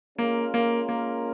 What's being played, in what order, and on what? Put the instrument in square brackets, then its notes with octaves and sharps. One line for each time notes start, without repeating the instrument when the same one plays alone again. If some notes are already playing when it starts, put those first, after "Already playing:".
[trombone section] G#3 C#4 F4 A#4 [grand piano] A#3
[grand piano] A#3
A#3